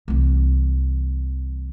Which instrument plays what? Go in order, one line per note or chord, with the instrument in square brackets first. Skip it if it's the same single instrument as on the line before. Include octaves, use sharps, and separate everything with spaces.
[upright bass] C2 E3